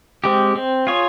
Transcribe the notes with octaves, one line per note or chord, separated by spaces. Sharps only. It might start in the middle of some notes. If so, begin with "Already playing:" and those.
G#3 C4 G4
C4
F4 G#4 C#5